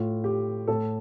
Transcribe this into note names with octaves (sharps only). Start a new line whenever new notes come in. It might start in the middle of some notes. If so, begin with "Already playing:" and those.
Already playing: A2 F4
G4
A2 A4